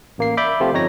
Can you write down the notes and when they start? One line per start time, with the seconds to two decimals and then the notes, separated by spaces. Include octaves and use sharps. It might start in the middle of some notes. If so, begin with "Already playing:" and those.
0.18 A1 A#3 C7
0.37 D5 E5 B5 D6 G6
0.60 C3 F3 A3 F4 G4
0.73 G1 F2 D#4 C#5 A#6